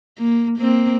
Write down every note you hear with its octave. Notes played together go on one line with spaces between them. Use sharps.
A#3
A#3 C4